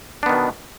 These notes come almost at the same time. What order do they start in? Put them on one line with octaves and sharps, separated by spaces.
D4 B3 D#3 B2